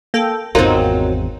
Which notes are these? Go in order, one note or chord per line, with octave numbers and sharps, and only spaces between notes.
A#3 A4 G5
G#1 E2 F#3 A#3 C4 D#4 F4 A#4